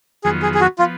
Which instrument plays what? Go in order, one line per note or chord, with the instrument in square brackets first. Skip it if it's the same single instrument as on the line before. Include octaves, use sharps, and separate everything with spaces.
[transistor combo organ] F2 D#3 F#3 B3 F4 [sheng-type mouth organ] G#4
[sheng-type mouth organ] G#4
G#4
F#4
[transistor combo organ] F3 B3 [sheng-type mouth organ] F4